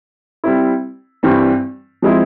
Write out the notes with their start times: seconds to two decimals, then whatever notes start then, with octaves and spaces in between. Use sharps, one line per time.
0.44 G3 C4 E4
1.23 G2 E3 G3 C4
2.02 F3 G#3 C4 E4